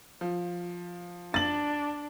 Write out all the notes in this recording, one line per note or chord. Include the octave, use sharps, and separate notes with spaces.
F3
D4 A6 F#7